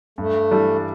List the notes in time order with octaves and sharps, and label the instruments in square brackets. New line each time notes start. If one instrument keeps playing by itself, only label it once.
[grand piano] G2 [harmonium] A3
[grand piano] E3 G3 D4 A4